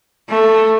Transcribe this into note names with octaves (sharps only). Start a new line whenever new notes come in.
A3